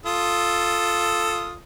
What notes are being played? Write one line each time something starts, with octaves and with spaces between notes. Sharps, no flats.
F4 A4 D#6